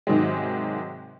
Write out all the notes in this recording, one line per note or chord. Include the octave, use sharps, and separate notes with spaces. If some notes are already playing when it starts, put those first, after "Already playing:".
G#2 C3 D#3 F#3 G#3